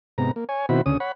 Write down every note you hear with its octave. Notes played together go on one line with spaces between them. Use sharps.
G#2 C3 B3 A#5
A#3
C#5 G#5
B2 D#3 C4 E4 F#4 B5
D2 C#3 C#4 D#6
C#5 F#5 B5